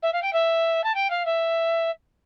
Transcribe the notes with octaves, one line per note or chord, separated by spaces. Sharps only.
E5
F5
G5
E5
A5
G5
F5
E5